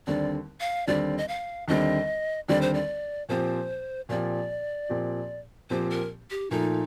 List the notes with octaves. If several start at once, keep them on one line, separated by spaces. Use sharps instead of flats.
D#2 D3 G3 C4 D5
F5
D#2 D3 G3 C4 D5
D#5
F5
D#2 D3 G3 C4 D#5
D#2 D3 G3 C4 D5
C5
D5
A#2 F3 C4 G4 C5
A#2 F3 C4 G4 D5
A#2 F3 C4 G4
A#2 F3 C4 G4 C5
A#4
G4
A#2 F3 A3 D#4